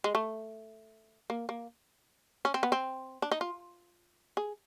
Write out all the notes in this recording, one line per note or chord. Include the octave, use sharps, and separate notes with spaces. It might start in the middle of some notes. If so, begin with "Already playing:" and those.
G#3
A3
A#3
A#3
C#4
C4
B3
C4
D4
D#4
F4
G#4